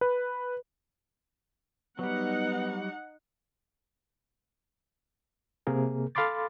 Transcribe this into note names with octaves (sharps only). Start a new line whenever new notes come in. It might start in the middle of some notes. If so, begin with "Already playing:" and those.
B4
F#3 G3 B3 D#4 F#5
C3 A#3 G#4 A#4
A4 F5 B5 C6 D6 A6